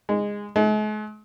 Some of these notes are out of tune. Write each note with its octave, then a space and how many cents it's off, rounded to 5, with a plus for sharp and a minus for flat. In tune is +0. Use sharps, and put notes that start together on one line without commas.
G#3 -15
G#3 +45